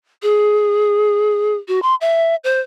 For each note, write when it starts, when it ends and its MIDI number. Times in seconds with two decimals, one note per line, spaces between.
0.23 1.55 68
1.68 1.82 66
1.82 1.95 84
2.01 2.36 76
2.44 2.60 72